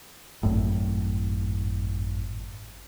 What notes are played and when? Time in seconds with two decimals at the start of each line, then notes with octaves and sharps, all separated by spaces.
0.43 G#1 F#2 A2